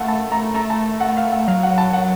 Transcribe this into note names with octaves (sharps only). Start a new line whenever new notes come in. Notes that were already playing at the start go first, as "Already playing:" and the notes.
Already playing: A3 F5 F#5
A5
A#5
A3 A#5
A5
F#5
F5
F#5
F#3 F5
F#5
A5
F#5